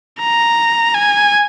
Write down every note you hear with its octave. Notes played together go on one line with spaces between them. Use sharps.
A#5
G#5